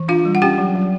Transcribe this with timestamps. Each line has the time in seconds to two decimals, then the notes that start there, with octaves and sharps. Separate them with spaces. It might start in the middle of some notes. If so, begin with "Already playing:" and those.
Already playing: E3
0.08 D4 F4 F5
0.25 G3
0.35 F#5
0.42 C#4 G4 G5
0.58 F#3
0.75 F#3